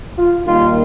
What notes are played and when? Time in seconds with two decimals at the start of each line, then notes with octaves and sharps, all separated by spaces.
0.19 F4
0.47 D#2 D#3 G3 A#3 F4